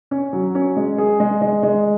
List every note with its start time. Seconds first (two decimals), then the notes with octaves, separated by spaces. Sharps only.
0.11 C#4
0.33 F#3
0.55 C#4
0.76 G#3
0.98 G#4
1.20 G#3
1.42 G#3
1.63 G#3